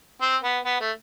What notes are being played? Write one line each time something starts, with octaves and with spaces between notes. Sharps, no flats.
C4
B3
B3
A3